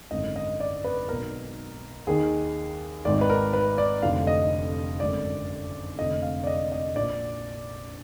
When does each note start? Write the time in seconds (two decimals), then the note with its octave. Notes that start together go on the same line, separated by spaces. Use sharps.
0.11 G#1 F#2 D3 D#5
0.36 D#5
0.60 D5
0.84 B4
1.09 B1 B2 A#4
2.07 D#2 D#3 G#4
3.05 G#1 G#2 D#3 D5
3.21 B4
3.30 A#4
3.53 B4
3.78 D5
4.02 F1 F2 D3 F5
4.27 D#5
5.00 G#1 F#2 D3 D5
5.99 F1 F2 D3 D#5
6.22 F5
6.44 D5
6.47 D#5
6.72 D#5
6.96 A#1 D5
7.01 A#2